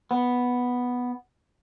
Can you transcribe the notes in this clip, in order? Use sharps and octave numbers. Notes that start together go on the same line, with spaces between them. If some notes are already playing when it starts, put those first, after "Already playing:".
B3